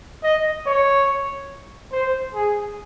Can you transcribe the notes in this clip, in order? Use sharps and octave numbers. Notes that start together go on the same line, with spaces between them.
D#5
C#5
C5
G#4